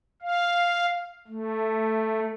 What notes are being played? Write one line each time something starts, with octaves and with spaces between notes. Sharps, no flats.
F5
A3